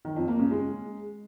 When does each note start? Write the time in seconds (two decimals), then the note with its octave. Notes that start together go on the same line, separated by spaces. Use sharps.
0.05 D#3
0.16 F2
0.28 A#3
0.39 C#3
0.51 G#3